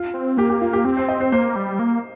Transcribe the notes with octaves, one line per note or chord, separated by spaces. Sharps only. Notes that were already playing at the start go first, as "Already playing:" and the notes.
Already playing: F4
C4
A#3 G4
G4
F4
G4
C4 G4
C5
D#5
C5
A#3 C5
G3
A#3